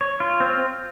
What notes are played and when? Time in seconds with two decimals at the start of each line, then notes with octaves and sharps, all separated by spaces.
0.01 C#5
0.20 F4
0.40 C4